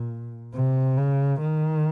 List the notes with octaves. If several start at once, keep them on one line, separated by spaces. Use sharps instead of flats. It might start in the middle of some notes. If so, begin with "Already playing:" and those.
Already playing: A#2
C3
C#3
D#3